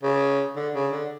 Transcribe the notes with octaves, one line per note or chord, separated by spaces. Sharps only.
C#3
D3
C#3
D3